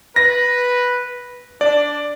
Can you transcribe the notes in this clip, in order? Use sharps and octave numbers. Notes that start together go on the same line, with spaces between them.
B4 A#6
D4 D5